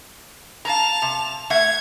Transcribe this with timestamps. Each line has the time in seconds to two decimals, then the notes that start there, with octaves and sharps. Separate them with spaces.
0.65 F5 A5 A#5 F7
1.02 C3
1.50 A3 E5 F#5 G#6